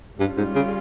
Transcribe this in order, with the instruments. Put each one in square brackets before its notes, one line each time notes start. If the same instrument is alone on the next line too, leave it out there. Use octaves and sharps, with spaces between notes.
[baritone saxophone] G2 [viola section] G3 C#4 F4
[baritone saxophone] G#2
C#3